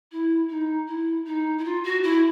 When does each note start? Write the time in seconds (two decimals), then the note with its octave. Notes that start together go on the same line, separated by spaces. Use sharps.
0.11 E4
0.49 D#4
0.87 E4
1.26 D#4
1.58 E4
1.64 F4
1.84 F#4
2.03 E4